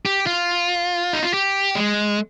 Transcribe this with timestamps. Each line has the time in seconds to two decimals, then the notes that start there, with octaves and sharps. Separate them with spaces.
0.06 G4
0.27 F4
1.13 D#4
1.23 F4
1.34 G4
1.75 G#3